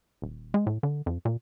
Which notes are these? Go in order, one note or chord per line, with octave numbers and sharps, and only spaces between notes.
D#1
G#3
A2
D3
F2
A#2